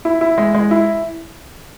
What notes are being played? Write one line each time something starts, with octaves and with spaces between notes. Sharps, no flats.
E4
E4
G#3
G#3
E4